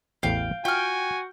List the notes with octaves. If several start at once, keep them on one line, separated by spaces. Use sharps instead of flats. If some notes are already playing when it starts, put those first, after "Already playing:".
A1 E2 A2 F5 G5
F4 F#4 G5 G#5 F6